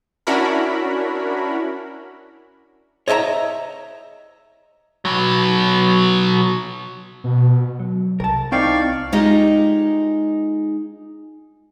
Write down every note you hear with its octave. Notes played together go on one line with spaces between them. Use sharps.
C#4 D4 E4 F#4 A#4 B5
C#5 D#5 E5 G5 A#5
B2 F#3
B2
F#3
C2 A#4 A5
C4 D#4 E4 D5 F5 G5 C#6
G#3 D#4 F4 G4 D#5